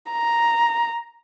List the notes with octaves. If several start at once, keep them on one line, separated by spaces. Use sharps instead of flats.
A#5